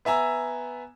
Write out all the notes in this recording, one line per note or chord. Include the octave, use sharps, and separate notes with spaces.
B3 E5 G#5 A#5 E6